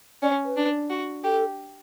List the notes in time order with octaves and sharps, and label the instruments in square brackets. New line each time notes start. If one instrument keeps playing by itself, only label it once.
[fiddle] C#4 [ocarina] D5
[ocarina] B4
[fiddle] D4
F#4
[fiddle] G4 [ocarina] A4